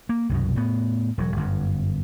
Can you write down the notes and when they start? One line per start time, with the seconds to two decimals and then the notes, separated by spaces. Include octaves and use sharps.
0.09 A#3
0.29 C2 F#2 B2
0.56 A2 B3
1.18 E1 F#3
1.37 G1 F#2